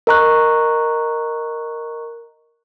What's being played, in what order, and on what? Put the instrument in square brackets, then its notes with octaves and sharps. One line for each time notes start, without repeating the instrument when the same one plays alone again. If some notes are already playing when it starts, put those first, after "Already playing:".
[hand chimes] A#4 D#5 A#5 C#6 F#6